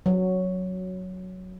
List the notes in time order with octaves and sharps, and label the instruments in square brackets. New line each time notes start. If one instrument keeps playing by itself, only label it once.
[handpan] F#3